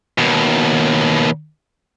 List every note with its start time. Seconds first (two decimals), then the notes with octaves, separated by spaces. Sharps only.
0.18 D#2 B2